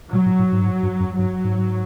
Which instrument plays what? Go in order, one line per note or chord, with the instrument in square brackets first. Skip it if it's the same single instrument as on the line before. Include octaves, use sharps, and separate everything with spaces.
[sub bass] A#2 [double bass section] F#3
[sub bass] A2
A2
G#2
G2
G#2
G2
F#2
[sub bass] G2 [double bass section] F#3
[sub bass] G#2